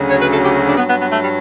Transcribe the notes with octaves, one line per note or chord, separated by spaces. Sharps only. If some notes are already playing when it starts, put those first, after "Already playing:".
Already playing: D2 C#3 F#3
C#5
B4
A4
G4
D4
G2 F#3 B3
B3
B3
A3
G3